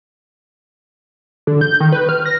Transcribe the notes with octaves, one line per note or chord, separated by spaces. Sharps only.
D3
G6
D#3
B4
F6
A#6